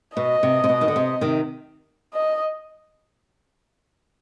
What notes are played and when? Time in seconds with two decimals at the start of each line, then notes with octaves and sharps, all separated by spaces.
0.17 B2 D#5
0.43 C3
0.64 C3
0.69 B2
0.81 D#3
0.88 D3
0.96 C3
1.21 C3 D#3
2.13 D#5